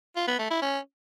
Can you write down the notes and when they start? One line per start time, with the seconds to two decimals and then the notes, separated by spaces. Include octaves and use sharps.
0.16 F4
0.28 B3
0.39 A3
0.50 E4
0.62 C#4